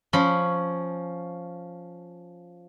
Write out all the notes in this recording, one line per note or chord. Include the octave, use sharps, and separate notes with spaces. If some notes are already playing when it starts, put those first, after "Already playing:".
F3 C#4 B5